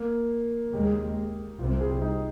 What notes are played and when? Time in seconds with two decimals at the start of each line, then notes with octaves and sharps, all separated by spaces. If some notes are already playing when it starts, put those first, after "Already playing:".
Already playing: A#3
0.73 D#2 C#3 G#3 G4
0.84 G#4
0.93 G4
1.59 C2 C3 G3 C4 F4
1.70 C5
1.81 G#4
1.91 G4
2.02 D#4